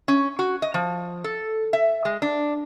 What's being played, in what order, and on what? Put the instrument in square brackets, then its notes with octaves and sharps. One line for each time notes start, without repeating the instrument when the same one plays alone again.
[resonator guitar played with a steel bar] C#4
F#4
D#5
F3
A4
E5
G#3
D4